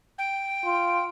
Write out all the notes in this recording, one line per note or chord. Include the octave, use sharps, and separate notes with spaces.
G5
F4